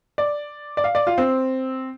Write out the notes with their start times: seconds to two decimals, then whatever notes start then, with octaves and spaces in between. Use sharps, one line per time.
0.18 D5
0.77 D5
0.84 F5
0.95 D5
1.07 F4
1.18 C4